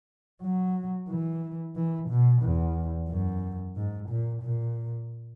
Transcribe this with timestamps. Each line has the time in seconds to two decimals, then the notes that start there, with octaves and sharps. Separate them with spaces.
0.41 F#3
1.09 E3
1.76 E3
2.09 B2
2.42 E2
3.09 F#2
3.76 G#2
4.09 A#2
4.42 A#2